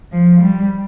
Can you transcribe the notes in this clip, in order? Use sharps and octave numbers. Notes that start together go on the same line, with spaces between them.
F3
G3